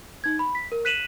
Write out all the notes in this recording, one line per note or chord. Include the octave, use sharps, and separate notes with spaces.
D#4 G#6
B5
B6
A#4
F#6 B6 D#7 E7 F#7